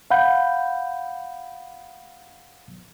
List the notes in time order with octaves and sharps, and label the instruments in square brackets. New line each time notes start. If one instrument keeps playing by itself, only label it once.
[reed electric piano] F5 F#5 B5 G6